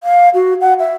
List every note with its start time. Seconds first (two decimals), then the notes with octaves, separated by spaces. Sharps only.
0.04 F5
0.34 F#4
0.61 F#5
0.79 E5